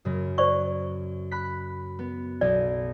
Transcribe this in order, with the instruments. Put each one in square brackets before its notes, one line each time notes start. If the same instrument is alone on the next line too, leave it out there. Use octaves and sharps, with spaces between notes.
[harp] F#2 C#3
[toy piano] C5 D5 C#6
[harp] B5 F#6 B6
B3
[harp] B1 [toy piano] D5